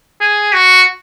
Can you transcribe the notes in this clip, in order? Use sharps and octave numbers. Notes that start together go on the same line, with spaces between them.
G#4
F#4